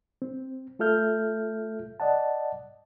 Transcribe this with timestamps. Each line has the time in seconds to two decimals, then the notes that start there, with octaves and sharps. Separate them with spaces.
0.22 C4
0.79 A3 F4 A4 E5 F6 G6
2.00 D5 D#5 F#5 A5